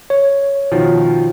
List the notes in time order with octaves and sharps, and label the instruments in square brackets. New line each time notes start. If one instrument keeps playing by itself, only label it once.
[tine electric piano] C#5
[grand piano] B2 D#3 F3